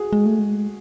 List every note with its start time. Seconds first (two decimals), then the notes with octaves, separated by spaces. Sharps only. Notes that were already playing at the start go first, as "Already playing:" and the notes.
Already playing: F#4 G#4
0.13 G#3
0.26 A3
0.39 G#3